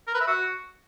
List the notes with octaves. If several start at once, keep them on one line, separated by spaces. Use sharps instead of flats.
A#4
B4
E5
F#4